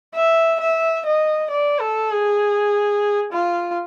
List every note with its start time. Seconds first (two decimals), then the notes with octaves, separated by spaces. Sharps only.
0.15 E5
0.60 E5
1.06 D#5
1.50 D5
1.81 A4
2.11 G#4
3.32 F4